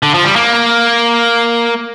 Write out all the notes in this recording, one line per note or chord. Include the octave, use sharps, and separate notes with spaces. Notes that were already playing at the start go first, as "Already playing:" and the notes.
D3
F3
G3
A#3